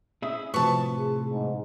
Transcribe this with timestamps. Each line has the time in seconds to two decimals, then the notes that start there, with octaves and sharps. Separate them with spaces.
0.22 C#4 E4 G#4 E5 D#6
0.54 A2 C3 F3 F#4 B4 A5 C#6
0.98 G#4
1.31 G#2